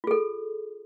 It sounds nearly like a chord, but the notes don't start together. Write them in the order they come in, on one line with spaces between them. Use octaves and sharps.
F4 G#4 A4